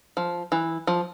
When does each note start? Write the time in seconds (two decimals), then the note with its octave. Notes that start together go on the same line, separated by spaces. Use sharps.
0.17 F3
0.52 E3
0.87 F3